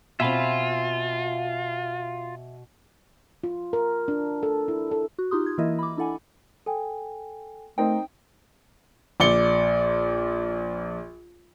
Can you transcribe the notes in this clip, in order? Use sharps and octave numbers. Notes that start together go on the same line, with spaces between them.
B2 C4 F4 E5 G#5 B5
F4
A#4
D4
A4
E4
A4
F#4
D#4 F4 G4 C6 D#6
G#6
E3 A#3 E4 A#4 D#5 E5
B5 D6
D4 E4 A4 F#5 G#5
A4 G5 G#5
A3 C4 D#4 A#4 G5
A#1 D5 C#7 G7